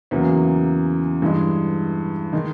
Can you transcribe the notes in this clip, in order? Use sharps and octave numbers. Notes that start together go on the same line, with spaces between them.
E2 C#3 F#3 A#3
G2 E3 G#3
D#3 G#3